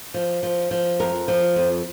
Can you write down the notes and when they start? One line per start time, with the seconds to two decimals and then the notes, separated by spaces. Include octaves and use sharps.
0.14 F3
0.43 F3
0.71 F3
1.00 F2 A#4
1.28 F3
1.56 F2